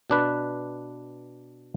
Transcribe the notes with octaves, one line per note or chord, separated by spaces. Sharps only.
B2 D4 B4